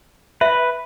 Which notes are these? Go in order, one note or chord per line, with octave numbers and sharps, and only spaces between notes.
B4 E5